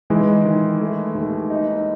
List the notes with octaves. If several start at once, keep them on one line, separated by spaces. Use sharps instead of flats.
E3 G#3 D#4
D#3
A3
D#2
D#4